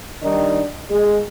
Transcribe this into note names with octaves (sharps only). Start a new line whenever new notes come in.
D#3 G3 D4 D#4
G#3